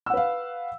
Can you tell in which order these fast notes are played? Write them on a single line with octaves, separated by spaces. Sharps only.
E6 F#5 B4 F5